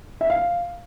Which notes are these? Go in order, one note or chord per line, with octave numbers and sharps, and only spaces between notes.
E5
F5